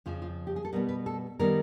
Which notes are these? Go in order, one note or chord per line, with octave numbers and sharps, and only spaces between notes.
F2 C#3 F3 F4
F4
G4
G#4
A4
B2 G3 B3 A#4
B4
A4
D#3 G3 B3 A#4